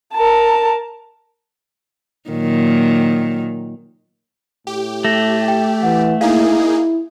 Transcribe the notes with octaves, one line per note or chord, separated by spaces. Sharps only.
A#4 A5
A#2 D#3 F#3
A2 G4
A3 A#6
G5
E3 F#5
A#3 D#4 E4 G#4 F5